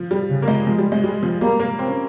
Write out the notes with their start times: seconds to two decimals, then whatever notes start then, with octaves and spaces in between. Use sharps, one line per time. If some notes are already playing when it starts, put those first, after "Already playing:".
Already playing: F3
0.11 G3
0.30 C#3
0.42 A#3
0.48 G#3
0.67 F3 G#3
0.79 G3
0.92 G#3
1.04 G3 G#3
1.23 F3
1.41 G3 A#3
1.60 A#3
1.79 C4
1.88 C#4